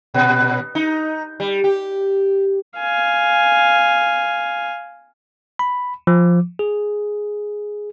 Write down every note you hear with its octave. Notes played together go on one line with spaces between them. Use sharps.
A#2
D#4
G3
G4
F5 G#5
B5
F3
G#4